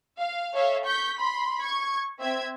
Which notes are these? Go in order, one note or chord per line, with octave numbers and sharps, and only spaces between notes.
F5
A4 C#5 E5 F5
C#6 G6 B6
B5 C6
C#6 G#6
C4 E5 G#6